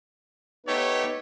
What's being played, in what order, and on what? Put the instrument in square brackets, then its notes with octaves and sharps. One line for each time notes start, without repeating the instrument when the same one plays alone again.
[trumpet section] A3 G4 C#5 [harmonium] B3 D#4 B4